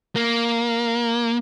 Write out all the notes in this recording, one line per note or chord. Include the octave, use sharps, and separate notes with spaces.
A#3